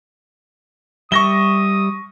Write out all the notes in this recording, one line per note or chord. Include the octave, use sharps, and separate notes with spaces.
G3 E5 C#6 D#6 A#6 G7